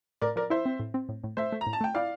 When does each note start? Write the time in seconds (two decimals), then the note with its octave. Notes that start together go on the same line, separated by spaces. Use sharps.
0.22 A2 A#4 D5
0.36 F3 A#4 D5
0.50 E4 C5 E5
0.65 C4
0.79 A2
0.94 C4
1.09 A2
1.24 A2
1.37 A3 C5 E5
1.52 A3
1.61 A#5
1.67 A2
1.73 A5
1.81 A3 G5
1.95 E4 D5 F5